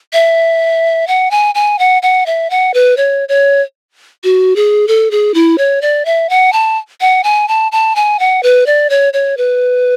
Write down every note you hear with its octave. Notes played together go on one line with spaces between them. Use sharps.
E5
F#5
G#5
G#5
F#5
F#5
E5
F#5
B4
C#5
C#5
F#4
G#4
A4
G#4
E4
C#5
D5
E5
F#5
A5
F#5
G#5
A5
A5
G#5
F#5
B4
D5
C#5
C#5
B4